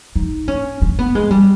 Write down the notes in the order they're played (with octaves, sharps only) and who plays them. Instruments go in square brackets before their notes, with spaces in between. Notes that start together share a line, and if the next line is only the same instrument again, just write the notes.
[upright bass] D#4
C#4
C#4
B3
G#3
G3